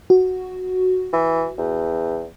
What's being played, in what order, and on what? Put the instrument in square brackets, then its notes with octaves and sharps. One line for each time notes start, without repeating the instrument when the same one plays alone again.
[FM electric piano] F#4
[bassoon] E3
E2